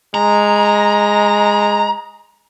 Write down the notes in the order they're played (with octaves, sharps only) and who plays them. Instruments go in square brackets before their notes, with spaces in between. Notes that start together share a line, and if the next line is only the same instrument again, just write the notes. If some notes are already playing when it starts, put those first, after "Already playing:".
[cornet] G#3 [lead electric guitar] A#5